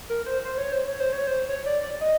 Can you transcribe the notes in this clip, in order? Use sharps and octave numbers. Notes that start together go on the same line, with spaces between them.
A#4
C5
C5
C#5
C5
C#5
C5
C#5
C5
C#5
D5
D5
D#5